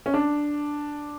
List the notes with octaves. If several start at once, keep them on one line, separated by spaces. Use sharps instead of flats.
C#4
D4